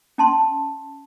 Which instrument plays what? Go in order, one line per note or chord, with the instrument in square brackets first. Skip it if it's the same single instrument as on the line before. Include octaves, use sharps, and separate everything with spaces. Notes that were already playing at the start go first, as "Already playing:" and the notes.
[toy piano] C#4 A5 C6